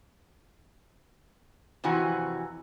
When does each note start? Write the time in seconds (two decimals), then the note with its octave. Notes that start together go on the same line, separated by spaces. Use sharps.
1.84 F2 C3 E3 F#4 G#5